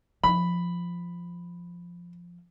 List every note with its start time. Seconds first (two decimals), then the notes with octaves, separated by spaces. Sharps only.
0.24 F3 B5